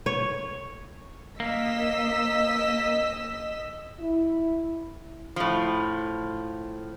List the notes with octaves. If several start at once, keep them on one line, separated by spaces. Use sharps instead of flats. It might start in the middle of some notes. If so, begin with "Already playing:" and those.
C#5
A#3 D#5 E6 B6
E4
A2 F3